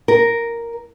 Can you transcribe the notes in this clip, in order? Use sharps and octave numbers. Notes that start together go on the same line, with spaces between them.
A#4